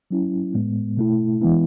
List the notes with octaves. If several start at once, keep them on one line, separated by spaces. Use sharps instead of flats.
F#3 C#4 E4
A2 G#3 B3
B2 A3 E4
E3 G#3 B3 E4